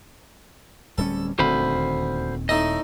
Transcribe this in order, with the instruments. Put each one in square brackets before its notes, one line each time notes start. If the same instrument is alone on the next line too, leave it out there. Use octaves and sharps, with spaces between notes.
[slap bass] D1 G3 C#4 [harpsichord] A4
[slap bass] D#1 D#3 C4 [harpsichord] D2 [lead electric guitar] C5 B5
[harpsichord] A2 D#4 A4 [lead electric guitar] D#5